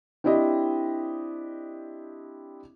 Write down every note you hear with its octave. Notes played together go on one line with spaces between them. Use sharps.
C4 D4 E4 G4 D#5